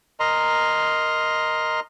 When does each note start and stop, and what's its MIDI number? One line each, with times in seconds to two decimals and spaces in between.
0.20 1.80 70
0.20 1.80 75
0.20 1.80 82
0.20 1.80 84